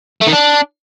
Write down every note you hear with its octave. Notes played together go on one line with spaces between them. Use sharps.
A3
D#3
D4